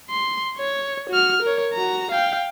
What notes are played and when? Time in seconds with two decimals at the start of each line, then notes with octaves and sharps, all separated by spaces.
0.10 C6
0.58 C#5
1.10 F#4 F6
1.43 A#4 C#5
1.73 F#4 A#5
2.11 F5 G5